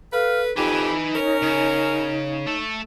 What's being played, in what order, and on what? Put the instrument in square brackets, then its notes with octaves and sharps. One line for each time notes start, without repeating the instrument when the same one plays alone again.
[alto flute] A4 [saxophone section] B4 [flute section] F5 F6
[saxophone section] F2 G4 [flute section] D#4 [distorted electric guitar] B4 G#5 [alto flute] B5
[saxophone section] C#4 A#4 [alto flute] C#5
[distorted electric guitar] C#3 [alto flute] C#5
[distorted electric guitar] A3 A4